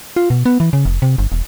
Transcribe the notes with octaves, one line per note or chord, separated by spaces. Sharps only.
F4
B2
B3
E3
C#3
F1
C3
G1
E1